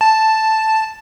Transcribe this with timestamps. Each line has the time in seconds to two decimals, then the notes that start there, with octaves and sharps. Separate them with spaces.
0.01 A5